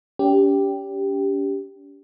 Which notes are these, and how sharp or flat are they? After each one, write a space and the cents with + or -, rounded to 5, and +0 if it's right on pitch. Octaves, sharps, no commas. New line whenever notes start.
C#4 +45 G4 +0